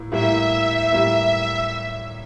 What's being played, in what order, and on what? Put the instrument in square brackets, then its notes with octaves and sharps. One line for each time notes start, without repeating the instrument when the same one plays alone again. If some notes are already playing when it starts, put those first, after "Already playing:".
Already playing: [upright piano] A2 A#3 E4
[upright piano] A2 G3 A#3 E4 [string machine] E5
[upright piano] A2 G3 A#3 E4